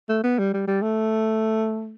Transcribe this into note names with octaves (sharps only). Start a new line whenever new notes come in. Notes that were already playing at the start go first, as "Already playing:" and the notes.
A3
B3
G3
G3
G3
A3